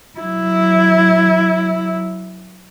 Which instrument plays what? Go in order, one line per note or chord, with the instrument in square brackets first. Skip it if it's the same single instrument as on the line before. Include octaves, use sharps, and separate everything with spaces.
[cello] F#3 E4